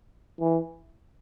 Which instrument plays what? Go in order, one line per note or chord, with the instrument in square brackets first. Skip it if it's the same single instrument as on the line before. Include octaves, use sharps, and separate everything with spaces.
[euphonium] E3